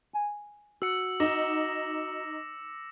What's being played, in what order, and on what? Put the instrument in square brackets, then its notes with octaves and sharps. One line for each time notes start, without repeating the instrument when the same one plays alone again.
[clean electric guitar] G#5
[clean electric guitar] F#4 [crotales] E6 C#7
[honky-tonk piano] D#4 [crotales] D6 A#6